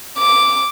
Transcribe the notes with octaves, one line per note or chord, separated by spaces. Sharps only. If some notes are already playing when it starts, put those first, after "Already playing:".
D6